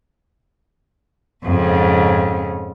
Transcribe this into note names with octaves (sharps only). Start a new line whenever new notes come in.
F2 G#2 C#3